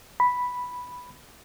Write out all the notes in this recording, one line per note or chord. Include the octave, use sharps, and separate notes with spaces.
B5